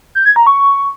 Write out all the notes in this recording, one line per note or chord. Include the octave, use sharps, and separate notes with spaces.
G6
G#6
A#5
C#6